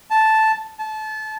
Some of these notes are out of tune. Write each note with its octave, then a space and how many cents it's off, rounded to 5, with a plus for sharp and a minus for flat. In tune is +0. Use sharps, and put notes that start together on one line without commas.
A5 -5
A5 -25